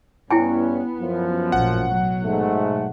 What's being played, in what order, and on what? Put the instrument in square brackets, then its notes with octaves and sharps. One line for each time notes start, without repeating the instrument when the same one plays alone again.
[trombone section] G2 C#4 [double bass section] B3 [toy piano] E4 G5 G#5
[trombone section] F#2 F3
[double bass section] A1 A#2 [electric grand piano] F#5
[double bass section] B2 F#3
[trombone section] G#2 A3